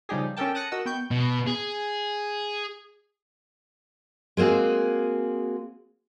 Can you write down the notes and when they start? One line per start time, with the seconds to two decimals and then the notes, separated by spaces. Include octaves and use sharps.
0.09 C#3 F3 G3 D#4 G4 G#4
0.37 C#4 G4 A4 A#4 G5 A5
0.55 A5 D#6 F#6 A#6 C#7
0.72 F#4 A#4 D#5 F#5 E6
0.86 B3 G5 C#6 G6
1.11 B2
1.48 G#4
4.37 G#3 A#3 C4 F#4 G#4